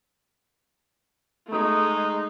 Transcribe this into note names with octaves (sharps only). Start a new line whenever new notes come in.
G#3 A3 D#4